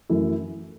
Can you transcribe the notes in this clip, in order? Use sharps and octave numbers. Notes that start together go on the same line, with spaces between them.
F#2 E3 A3 E4